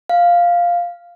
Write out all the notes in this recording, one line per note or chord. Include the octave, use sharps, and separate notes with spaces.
F5